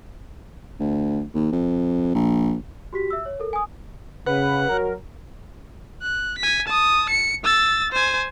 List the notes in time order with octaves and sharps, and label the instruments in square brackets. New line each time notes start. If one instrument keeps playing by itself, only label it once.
[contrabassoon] D2
D#2
F2
A#1
[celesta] F#4 G4 B6
E5 E6
C#5
A4 A#4
G#5 D#6
[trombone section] C#3 [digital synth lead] B4 [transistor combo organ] F#5
[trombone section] F#3 [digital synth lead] A#4
[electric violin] F#6
G#5 B6
A5 D#6
C#7
E6 A6
C5 G#5